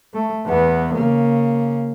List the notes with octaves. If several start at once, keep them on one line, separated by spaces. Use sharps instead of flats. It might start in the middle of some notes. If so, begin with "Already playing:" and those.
A3
E2 B3
C#3 A#3